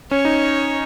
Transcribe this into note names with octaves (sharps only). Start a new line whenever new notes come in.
C#4 C#5
D#4